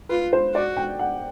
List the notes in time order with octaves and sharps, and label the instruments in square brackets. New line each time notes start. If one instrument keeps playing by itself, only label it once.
[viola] F4 [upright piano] B4
[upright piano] C5
[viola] F#4 [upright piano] D5
[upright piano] G5
F#5